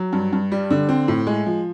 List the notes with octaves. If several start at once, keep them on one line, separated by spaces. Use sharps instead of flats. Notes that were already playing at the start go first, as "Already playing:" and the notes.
Already playing: F#3
G2
G2
G3
D3
C4
A2
G#3
F3